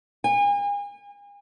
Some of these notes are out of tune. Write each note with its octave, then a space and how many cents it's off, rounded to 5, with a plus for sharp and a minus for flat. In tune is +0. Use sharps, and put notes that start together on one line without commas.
G#5 -40